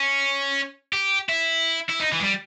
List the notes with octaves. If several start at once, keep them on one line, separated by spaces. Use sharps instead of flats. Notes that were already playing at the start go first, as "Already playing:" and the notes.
Already playing: C#4
G4
E4
E4
D#4
E3
G#3
G3